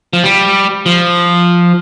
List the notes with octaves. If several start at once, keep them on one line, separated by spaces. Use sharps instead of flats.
F3
G3
F3